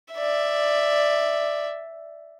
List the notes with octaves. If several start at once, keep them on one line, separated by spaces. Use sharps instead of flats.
D5 E5